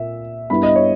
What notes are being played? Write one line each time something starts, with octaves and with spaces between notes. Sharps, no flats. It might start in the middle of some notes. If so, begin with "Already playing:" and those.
Already playing: A#2 E5
G2 G3 B3 E4 B5
D#5
C#5